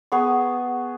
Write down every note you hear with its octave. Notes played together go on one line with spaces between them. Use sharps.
B3 G#4 C#6